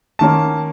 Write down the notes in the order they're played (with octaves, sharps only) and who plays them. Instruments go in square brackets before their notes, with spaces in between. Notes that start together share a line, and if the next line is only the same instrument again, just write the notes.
[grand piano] D#3 A#3 C#4 A5